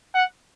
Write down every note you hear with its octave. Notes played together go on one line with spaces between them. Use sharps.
F#5